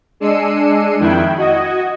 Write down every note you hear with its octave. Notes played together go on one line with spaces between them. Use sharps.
G#3 D4 E6 C7 C#7 D#7
F2 D#3 E4 G5 F#6 G#6
F#4 D#5 G#6